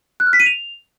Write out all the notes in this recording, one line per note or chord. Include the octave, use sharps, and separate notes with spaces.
F#6
F6
B6
D#7
F7